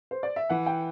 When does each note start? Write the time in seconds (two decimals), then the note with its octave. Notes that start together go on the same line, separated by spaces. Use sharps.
0.11 C5
0.23 D5
0.36 E5
0.49 E3 F#5
0.66 G5